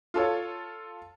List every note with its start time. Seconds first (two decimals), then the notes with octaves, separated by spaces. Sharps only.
0.14 F4 A4 C#5